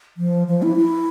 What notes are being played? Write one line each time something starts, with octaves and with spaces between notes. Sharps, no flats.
F3
F3
E4
E4